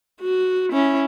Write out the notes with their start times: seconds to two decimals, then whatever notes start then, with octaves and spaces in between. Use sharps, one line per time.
0.21 F#4
0.73 C#4 E4